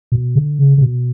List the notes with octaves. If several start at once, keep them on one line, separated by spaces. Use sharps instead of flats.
B2
D3
C#3
C#3
B2